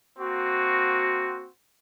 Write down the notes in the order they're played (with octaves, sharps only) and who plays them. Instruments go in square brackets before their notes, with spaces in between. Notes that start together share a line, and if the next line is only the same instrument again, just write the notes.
[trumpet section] A#3 C4 F#4